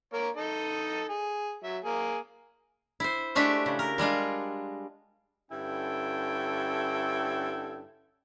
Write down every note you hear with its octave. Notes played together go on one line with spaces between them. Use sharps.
A#3 A#4 C#5
D#4 A4 D#5
G#4
F#3 E5
A#3 G#4
E4 C5
G#3 A3 D4 F#4 G4 E5
C#3
A#4
G3 G#3 D4 F4
G2 D3 C#4 E4 A4 G5